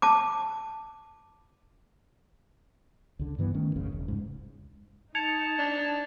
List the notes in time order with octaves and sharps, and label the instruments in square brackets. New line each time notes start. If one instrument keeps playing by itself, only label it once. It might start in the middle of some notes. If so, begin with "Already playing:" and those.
[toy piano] A5 D6
[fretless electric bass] C#2 D3
G2 E3 B3
D#3 A3 C#4
E1 B1 F#2 C#3
E1
C#2 G#2
[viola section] D#4 [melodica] A5 [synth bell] G#6 C#7 F7
[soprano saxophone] D4